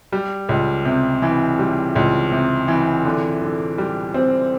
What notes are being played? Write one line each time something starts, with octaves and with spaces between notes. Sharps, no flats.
G3
C#2
C3
E3
G3
C#2
C3
E3
D3
D3
G3
C4